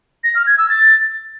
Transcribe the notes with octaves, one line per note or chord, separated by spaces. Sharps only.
A#6
F6
G#6
E6
A6